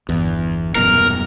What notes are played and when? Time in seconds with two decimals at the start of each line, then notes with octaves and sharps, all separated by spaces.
0.09 G1 E2 E3
0.75 D#1 F#2 B2 A#4